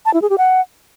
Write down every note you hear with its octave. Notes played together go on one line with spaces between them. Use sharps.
A5
E4
G#4
G4
F#5